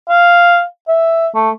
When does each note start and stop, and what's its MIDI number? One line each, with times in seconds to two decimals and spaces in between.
0.09 0.63 77
0.88 1.28 76
1.34 1.50 57